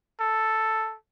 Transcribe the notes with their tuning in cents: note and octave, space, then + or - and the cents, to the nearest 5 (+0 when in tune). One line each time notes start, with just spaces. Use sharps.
A4 +0